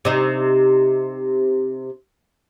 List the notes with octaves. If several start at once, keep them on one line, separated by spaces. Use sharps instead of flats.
C3 D#4